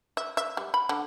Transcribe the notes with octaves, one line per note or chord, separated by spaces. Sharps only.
E5
E5
G3
B5
D3